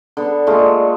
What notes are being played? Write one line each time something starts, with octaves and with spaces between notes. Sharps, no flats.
D3 B3
A#2 G#3 A3 F4